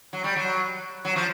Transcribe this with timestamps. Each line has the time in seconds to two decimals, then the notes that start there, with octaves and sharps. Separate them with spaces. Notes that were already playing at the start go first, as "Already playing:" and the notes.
0.13 F#3
0.24 G3
0.36 F#3
1.05 F#3
1.16 F3